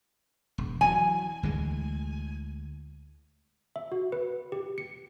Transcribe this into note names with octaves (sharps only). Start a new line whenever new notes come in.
E1
E3 F#3 G#5
D2 E3 G#3
E5
F#4
B4
G4
C#7